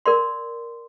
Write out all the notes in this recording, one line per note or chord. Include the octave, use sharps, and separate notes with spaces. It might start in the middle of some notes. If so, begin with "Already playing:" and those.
A#4 D5 C6